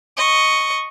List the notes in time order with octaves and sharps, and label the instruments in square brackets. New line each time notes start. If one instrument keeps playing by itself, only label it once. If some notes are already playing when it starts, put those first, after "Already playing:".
[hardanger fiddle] D#5 C#6